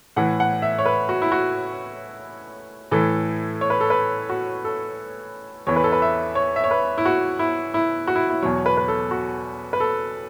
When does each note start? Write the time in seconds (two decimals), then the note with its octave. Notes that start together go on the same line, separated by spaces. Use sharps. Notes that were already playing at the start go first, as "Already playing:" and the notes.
0.16 A2 E3 F#5
0.40 F#5
0.62 E5
0.79 C#5
0.86 B4
1.09 F#4
1.22 E4
1.32 F#4
2.91 A2 E3 A4
3.61 C#5
3.70 B4
3.81 A4
3.90 B4
4.29 F#4
4.64 A4
5.67 E2 E3 C#5
5.76 B4
5.84 A4
5.92 B4
6.02 E5
6.35 C#5
6.56 E5
6.64 C#5
6.71 B4
6.98 E4
7.05 F#4
7.39 E4
7.74 E4
8.07 F#4
8.16 E4
8.30 E4
8.42 E2 B2 F#3 C#5
8.66 B4
8.77 B4
8.88 A4
9.11 F#4
9.73 B4
9.80 A4